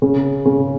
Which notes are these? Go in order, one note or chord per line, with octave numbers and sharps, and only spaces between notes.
C#3
C#3